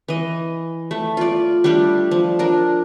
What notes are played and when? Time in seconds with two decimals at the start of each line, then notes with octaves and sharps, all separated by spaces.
0.08 E3 D#5
0.91 A3
1.17 F4 D5
1.64 G3 A3 D4 G4
2.11 F3
2.39 D4 A#4